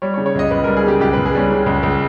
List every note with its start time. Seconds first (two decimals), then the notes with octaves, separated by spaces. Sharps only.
0.02 G3 C#5
0.14 C#5
0.18 C#3
0.26 C#5
0.35 C#2 D#5
0.51 C#2 B4
0.64 G3 A#4
0.77 G#4
0.85 C#3 G4
1.00 C#2 G4
1.13 C#2 B4
1.26 G#4
1.34 G3 C#4
1.51 C#3
1.66 C#2
1.83 C#2